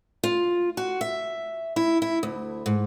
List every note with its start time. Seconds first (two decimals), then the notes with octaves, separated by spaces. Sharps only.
0.23 F4
0.77 F#4
1.01 E5
1.76 E4
2.02 E4
2.23 D2
2.66 G#2